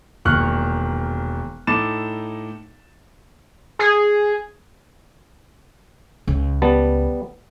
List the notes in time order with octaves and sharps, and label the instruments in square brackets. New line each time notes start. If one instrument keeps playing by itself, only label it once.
[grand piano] E1 A#2 D#3 C#6 F6 F#6
A2 D#4 A4 D6 A6 E7
[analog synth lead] G#4
[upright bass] C#2
[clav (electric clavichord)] G3 B3 A5